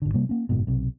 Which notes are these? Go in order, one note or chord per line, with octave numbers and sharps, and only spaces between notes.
G#1 D3
C3 G3 A#3
A#3 C#4
F#1 G#2 B2
B1 C3